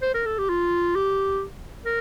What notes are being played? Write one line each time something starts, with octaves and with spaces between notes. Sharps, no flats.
C5
A#4
A4
G4
F4
G4
A#4